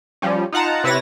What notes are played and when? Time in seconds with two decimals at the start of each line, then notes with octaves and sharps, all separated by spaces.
0.22 F3 G3 C#4
0.52 D#4 F4 F#5 A5 A#5
0.84 C3 E4 B4 C#5 A6 A#6